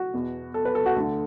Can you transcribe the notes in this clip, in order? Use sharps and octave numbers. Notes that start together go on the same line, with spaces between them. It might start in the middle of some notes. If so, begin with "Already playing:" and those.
Already playing: F#4
E2 B2
A4
B4
A4
F#4
D2 D3 A4